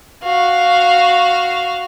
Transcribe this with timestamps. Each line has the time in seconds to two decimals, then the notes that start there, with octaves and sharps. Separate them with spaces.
0.24 F#4 F5